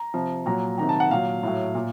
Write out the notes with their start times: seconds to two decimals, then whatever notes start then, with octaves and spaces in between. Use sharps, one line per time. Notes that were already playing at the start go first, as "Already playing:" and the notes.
Already playing: A#5
0.14 C3 F3
0.46 A#2 F#3 A#5
0.78 C3 D#3 F#3 A#5
0.89 A5
1.00 F#5
1.11 A#2 F#3 F5
1.43 A2 F#3
1.75 A#2